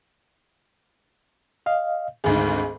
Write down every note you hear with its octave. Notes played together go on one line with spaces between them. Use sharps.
D#5 F5
G#1 D2 G#2 G#4